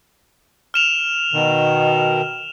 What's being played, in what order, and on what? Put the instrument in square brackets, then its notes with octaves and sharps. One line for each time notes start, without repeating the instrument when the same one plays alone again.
[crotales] F6 E7 F7
[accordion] B2 D#3